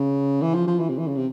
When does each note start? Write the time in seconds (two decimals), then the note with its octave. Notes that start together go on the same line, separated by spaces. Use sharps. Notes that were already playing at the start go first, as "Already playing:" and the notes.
Already playing: C#3
0.42 E3
0.54 F3
0.67 F3
0.79 E3
0.89 C3
0.98 E3
1.07 C#3
1.17 C3